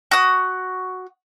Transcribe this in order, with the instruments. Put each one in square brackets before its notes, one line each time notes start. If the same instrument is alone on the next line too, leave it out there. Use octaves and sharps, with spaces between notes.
[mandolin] F#4 D#6